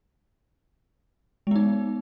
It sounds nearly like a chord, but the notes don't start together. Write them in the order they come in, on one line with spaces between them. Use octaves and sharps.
G#3 B3 D#4